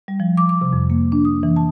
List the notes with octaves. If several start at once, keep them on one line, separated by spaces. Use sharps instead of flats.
G3
F3
D6
D6
C3
F2
A#3
D4
D#6
E3
A5